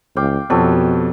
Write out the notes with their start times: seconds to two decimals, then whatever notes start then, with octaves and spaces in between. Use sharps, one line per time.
0.16 C#2 F5 G5 D6
0.50 F2 B2 F#3 G4 A4